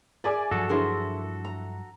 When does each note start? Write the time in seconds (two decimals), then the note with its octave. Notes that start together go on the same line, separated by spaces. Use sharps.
0.24 G#4 D5 E5 G#5 D6
0.51 G2 F3 F#3 F#4 A4
0.69 D3 E4 G#4 A#4 C5
1.45 A#5